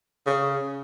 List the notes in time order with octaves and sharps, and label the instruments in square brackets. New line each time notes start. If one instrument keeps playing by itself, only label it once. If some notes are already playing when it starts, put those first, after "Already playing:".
[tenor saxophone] C#3